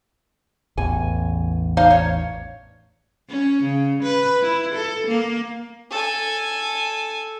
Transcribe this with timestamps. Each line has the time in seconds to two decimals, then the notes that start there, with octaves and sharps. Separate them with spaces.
0.77 A1 E2 G#5
1.77 D#4 C5 F5
1.90 C#5
3.29 C#4
3.63 C#3
4.03 B4
4.42 E4
4.75 A4
5.07 A#3
5.91 A4 G#5